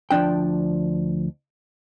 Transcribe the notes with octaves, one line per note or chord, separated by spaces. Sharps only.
D2 F3 A#3 D4 G5